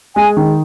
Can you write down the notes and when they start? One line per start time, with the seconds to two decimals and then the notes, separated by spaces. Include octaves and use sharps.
0.15 G#3 G#5
0.37 D#3